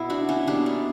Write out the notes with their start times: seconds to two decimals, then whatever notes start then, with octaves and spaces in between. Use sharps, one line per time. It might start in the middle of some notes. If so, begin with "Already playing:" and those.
Already playing: B2 B3 E4
0.10 D4 F#4
0.29 C#4 E4
0.47 B2 G3 A#3 D4
0.66 D4